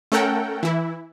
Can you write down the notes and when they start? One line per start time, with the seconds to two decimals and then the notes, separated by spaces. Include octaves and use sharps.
0.12 A3 C#4 A4 A#4 F#5 G5
0.63 E3 E4